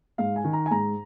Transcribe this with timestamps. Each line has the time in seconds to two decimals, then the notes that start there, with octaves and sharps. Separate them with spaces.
0.18 G#2 F5
0.36 G#5
0.44 D#3
0.53 A#5
0.66 G#5
0.71 G#2 A#5